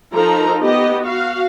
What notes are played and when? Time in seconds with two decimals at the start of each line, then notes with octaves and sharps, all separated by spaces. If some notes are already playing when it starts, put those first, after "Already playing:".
0.15 F3 D#4 A4 A#4 A#5
0.64 B3 G4 D#5
1.06 F#4 F5